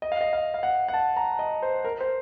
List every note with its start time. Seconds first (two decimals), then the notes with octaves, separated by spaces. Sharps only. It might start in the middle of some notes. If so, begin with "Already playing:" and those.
0.02 D#5
0.12 F5
0.21 D#5
0.33 F5
0.54 F5
0.63 F#5
0.88 F#5
0.94 A5
1.17 A#5
1.39 D#5
1.62 C5
1.85 A#4
2.01 C5